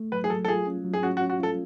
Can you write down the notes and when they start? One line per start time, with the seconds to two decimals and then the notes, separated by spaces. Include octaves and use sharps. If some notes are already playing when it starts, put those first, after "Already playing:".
Already playing: A3
0.12 F#3 B4
0.24 G#4
0.30 F#3 A4
0.45 A4
0.48 F4 G#4
0.67 C#4
0.85 F#3
0.93 G#4
1.03 C#4 F#4
1.17 F#4
1.21 C#4
1.30 F#4
1.40 F4 A4